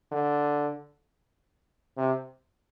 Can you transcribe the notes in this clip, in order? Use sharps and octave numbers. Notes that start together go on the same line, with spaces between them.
D3
C3